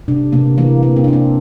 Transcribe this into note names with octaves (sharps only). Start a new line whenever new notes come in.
C3 D4
C3 A#3
E3 A#3
A#3
C4
D4
A#3 C4